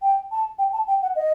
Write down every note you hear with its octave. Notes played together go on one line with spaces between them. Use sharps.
G5
A5
G5
A5
G5
F#5
D#5